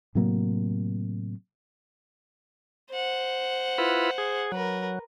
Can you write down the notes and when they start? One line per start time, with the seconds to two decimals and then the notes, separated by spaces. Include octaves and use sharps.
0.15 A2 C3 F#3 A#3
2.91 C5 F#5
3.78 E4 F4 B4
4.18 G#4
4.52 F#3 A#4 B4